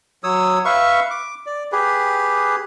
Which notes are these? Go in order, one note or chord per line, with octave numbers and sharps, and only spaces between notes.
F#3 C#5 D#6 E6
B4 E5 F5 C#6
D6
D5
G4 G#4 B4